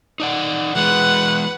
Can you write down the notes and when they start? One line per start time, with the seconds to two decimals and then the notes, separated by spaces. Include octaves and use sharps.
0.20 D#4 D5 F#5
0.75 E3 G#3 B4 F#5